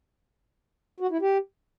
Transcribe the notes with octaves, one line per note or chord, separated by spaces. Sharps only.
F#4
E4
G4